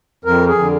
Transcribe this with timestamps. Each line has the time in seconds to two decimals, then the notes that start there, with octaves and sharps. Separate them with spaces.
0.25 F2 A#4
0.48 G#4
0.59 D3